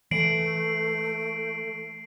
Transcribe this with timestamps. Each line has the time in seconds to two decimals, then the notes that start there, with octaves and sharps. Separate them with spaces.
0.11 E3 A3 C7 D7 F#7